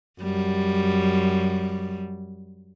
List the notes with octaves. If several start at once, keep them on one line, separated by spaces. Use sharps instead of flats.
F#2 G3